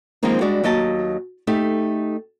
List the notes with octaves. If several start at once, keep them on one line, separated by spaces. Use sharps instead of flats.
D#3 F3 G#3 A#3 C4 D#4
G3 G#3 D4 F#4
D#2 F#3 D#5 A5
A3 D#4 G4